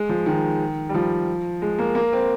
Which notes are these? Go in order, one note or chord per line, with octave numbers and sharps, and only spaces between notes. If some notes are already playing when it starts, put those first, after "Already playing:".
Already playing: G#3
F3
D#3
G3
F3
G#3
A#3
A#3
C4